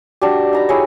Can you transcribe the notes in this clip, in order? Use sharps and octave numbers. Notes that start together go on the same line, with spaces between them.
D4 F#4 G4
D#4 A#5 B5
E4 G#4 C#5